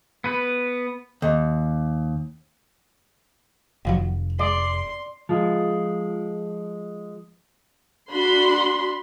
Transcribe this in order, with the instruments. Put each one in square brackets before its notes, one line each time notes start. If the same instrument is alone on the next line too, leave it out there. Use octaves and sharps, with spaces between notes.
[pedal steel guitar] B3 B4
[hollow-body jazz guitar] D#2
[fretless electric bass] F1 [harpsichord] D#2 F3 F#3
[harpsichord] G#3 [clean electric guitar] D5 [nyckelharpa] C6
[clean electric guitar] F3 G#3
[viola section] D4 F#4 B5 C6